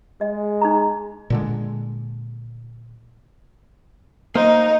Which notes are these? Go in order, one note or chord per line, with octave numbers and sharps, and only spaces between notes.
G#3 D#5
D#4 G#4 A#5
A#2 D3 G#3
A#3 D#4 C5